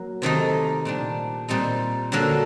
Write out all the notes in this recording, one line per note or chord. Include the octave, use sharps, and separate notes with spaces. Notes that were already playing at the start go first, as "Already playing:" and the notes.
Already playing: F#3 A#3
C3 D#3 A3 D#4
A#2 G3 D4
A#2 G3 C4 D#4
D3 F#3 A#3 D4